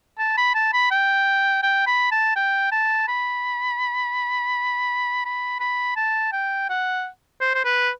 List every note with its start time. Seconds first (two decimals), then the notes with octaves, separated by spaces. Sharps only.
0.19 A5
0.38 B5
0.55 A5
0.74 B5
0.91 G5
1.63 G5
1.87 B5
2.12 A5
2.36 G5
2.72 A5
3.08 B5
5.25 B5
5.60 B5
5.97 A5
6.33 G5
6.70 F#5
7.41 C5
7.55 C5
7.65 B4